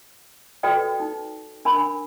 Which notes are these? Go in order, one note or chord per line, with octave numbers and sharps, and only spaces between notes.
F#4 A4 B4 D5 G5 D#6
D#4
D4 A#4 G#5 B5